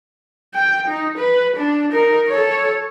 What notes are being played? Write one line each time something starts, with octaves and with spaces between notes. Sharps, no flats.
G5
D#4
B4
D4
D#4 A#4
A4 C#5